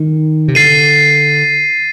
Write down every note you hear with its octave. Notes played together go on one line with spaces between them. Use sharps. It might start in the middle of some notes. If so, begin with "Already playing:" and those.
Already playing: D#3
C3
D3 A6 C7 D#7